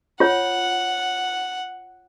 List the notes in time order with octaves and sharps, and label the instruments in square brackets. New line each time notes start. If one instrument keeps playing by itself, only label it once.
[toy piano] F4 C#5 [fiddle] F#5